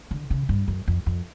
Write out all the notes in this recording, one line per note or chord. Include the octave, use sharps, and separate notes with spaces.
D3
C#3
G2
F#2
F2
F2